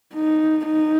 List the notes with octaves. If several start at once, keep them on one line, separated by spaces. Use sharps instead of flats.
D#4
D#4